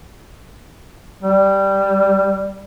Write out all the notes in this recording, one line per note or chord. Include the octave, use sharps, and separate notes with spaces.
G3